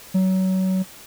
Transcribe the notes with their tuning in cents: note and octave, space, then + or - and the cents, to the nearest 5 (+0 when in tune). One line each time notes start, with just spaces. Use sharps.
F#3 +25